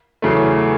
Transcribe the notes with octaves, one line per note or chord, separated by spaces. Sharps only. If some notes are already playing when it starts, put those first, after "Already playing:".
E2 C#3 F#3 A3